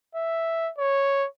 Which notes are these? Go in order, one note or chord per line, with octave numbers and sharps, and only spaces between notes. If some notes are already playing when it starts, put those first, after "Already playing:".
E5
C#5